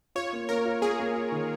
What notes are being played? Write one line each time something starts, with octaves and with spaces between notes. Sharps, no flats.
F4 C#5
A#3
A#3 A#4
F4
A#3 G#4
A#3
F4
D#3